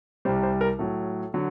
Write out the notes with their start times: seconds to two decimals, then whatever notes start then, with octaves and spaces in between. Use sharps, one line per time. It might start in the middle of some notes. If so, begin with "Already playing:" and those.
0.25 C2 C3 G3 C5
0.43 C5
0.61 A#4
0.79 A2 F#3 A4
1.34 D3 F#3